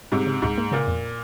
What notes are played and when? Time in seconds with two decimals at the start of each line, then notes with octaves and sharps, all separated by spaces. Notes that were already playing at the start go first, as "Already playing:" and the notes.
0.12 G#2 C3 G3
0.27 C#3
0.42 C#2 G#2
0.58 A#3
0.72 A#2 C#3
0.87 F2